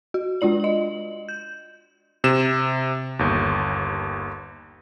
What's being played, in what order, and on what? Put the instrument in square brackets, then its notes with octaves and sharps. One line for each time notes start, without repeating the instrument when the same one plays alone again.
[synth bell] F#4
G#3 D4 F4 D5 F#7
D#5 F#7
G6
[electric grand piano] C3 E7
G1 D#2